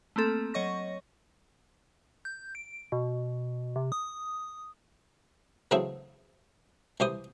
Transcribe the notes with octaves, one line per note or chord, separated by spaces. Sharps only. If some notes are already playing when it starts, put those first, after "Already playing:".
A3 A#3 C4 A4
F#3 C#5 D#5 C#6 A#6
G6
D7
B2
C3
D#6
C#3 E3 F#3 A3 C4 G#4
C2 E3 G4 C5 D#6